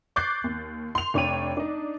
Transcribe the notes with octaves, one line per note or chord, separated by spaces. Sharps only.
C#6 D6 F#6 G6 A6 C7
D#2
C6 F7
F1 D4 C#5 G5 D#7 F7
D4 D#4